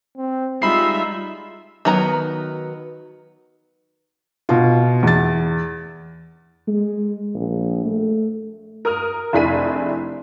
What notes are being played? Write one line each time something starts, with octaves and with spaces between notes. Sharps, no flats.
C4
G3 G#3 D#4 F4 E5 B5 C7
D#3 F#3 B3 A#5
B2 F4
E2 A6
G#3
A#1
A3
A#4 D#6 F6
F1 D4 E4 G#4 B6 D#7